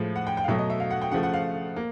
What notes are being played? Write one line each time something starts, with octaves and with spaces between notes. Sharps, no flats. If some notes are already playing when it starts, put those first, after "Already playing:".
Already playing: A2 F3 G#3
F#5
G5
G5
F5
B2 F#3 A3 E5
D#5
E5
F5
F#5
G5
C#3 F3 A3 F#5
F#5
F5
A#3